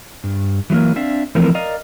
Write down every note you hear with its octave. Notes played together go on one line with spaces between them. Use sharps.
G2
E3 F#3 G#3 A#3 A#4
C4 D4 E5 F5
E3 F3 A3 C4 A#4
A#4 D5 D#5 F5 A#5